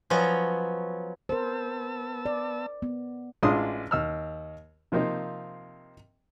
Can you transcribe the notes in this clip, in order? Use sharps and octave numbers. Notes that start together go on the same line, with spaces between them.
F3 F#3 B3 C#4 D#5 A#5
B3 A#4 C5 A5 E6
D5
B3
A1 G#3 D4 F4 C6 D#6
D#2 E6 F6
C3 F3 A#3 C4 D#4